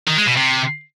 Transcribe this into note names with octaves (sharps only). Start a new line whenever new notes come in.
D#3
G#3
B2
C3